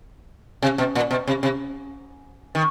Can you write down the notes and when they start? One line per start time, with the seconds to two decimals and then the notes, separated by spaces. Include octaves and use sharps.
0.62 C3
0.78 B2
0.95 A#2
1.11 B2
1.27 C3
1.43 C3
2.55 D#3